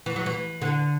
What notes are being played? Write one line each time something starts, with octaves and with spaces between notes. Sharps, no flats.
E3
F#3
E3
D3